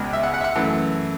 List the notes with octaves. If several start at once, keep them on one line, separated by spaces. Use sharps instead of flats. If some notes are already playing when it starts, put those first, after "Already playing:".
Already playing: C#2 B2 G#3
E5
F#5
F#5
E5
F#5
F#2 E3 A3